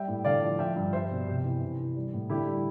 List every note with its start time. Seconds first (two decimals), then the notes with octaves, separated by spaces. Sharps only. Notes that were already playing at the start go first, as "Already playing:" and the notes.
Already playing: G3 E5 G5
0.08 A2
0.25 D3 D5 F5
0.43 F3
0.59 F3 E5 G5
0.76 G2
0.93 G3 C5 E5
1.11 B2
1.28 C3
1.44 E3
1.61 C3
1.78 E3
1.96 G3
2.13 A2
2.30 D3 E4 G4
2.47 G3